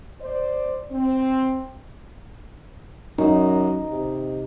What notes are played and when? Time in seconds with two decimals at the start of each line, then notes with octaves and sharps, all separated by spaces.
0.21 C5 D5
0.90 C4
3.18 F#2 D#4
3.92 C3